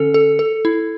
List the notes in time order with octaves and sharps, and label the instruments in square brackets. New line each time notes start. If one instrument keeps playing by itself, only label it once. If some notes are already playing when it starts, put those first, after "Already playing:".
Already playing: [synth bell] D3 C#4 A4
A4
A4
E4